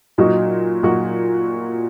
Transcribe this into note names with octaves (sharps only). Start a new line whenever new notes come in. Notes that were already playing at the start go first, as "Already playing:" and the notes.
A#2 F#3 D#4 F#4
A#2 F#3 D#4 F#4